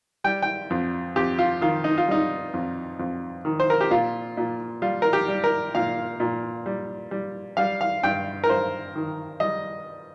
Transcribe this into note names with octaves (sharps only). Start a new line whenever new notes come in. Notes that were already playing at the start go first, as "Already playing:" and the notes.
G3 G5
G5
F2
F2 G4
F4
D#3 F4
D#4
F4
G3 D#4
F2
F2
D#3
C5
A#4
G4
A#2 F4
A#2
G3 F4
A#4
G4
G3
A#4
A#2 F5
A#2
G3
G3
G3 F5
F5
G2 G5
A#4
G2 C5
D#3
G3 D#5